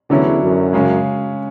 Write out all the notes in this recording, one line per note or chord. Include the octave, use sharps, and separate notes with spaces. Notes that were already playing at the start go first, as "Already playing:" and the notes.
E2 D3 F#3 C#4 E4
F#2
C#3 G#3 C#4